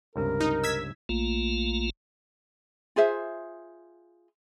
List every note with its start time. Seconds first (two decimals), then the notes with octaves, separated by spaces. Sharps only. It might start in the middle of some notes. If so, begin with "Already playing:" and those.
0.16 C#2 G2 C3 A#4
0.40 D#4
0.64 E6 G#6 B6
1.09 A#1 A3 A#3 F4
2.96 F4 G#4 C5 E5